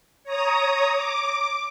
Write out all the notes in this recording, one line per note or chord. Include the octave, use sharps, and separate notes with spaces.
C#5 A#5 D#6
D6